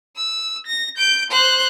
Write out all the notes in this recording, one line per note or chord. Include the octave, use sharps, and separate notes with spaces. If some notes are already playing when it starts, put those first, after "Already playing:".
E6
A#6
G6 D7
C5 F#6